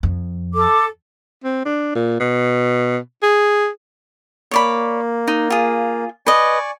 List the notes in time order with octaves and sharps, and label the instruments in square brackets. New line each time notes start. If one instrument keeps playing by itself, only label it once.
[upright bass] F2
[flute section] A4 D6
[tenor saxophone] C4
D4
A#2
B2
G#4
[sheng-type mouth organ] A#3 [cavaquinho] C#5 D5 B5
[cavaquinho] D#4
F4 G#4
[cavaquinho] B4 D#5 [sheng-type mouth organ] D5 G#5 C#6